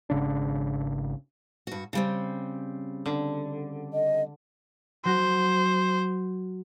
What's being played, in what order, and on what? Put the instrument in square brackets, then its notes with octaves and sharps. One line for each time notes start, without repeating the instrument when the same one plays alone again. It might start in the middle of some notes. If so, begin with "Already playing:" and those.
[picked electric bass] G#1 C#3 D4
[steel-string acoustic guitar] G2 F#4
C#3 G3 C4
[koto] D3
[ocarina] D#5
[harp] F#3 F#4 [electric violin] C5